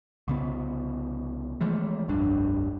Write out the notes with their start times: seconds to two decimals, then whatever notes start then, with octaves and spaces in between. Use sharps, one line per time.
0.28 C2 C#3 B3
1.61 E3 F3 G#3 A3
2.08 F1 C2 G2 D4